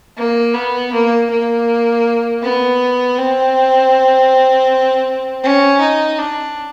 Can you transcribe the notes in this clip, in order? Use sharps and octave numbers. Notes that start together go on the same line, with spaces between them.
A#3
B3
A#3
A#3
B3
C4
C#4
D#4
D4